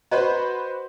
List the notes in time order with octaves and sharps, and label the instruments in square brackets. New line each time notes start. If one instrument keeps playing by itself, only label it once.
[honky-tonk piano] F#4 B4 C5 [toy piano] D#5 A#5